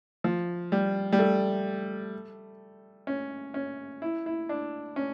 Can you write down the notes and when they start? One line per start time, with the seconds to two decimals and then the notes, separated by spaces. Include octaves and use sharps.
0.24 F3
0.72 G3
1.13 G3
1.19 A3
3.07 C#4
3.54 C#4
4.02 E4
4.26 E4
4.49 D4
4.96 C#4